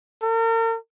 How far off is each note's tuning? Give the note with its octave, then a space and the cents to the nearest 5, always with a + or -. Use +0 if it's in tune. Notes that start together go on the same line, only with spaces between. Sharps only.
A#4 -40